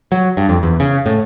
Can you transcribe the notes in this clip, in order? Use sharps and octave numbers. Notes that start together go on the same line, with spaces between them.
F#3
G2
F2
E2
C#3
A2